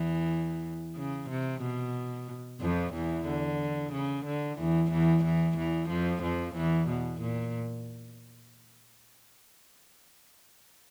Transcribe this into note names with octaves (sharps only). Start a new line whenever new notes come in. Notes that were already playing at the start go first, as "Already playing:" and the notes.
Already playing: E2 E3
C#3
C3
B2
F2 F3
E2 E3
D3
C#3
D3
E2 E3
E2 E3
E2 E3
E2 E3
F2 F3
F2 F3
E2 E3
B2
A#2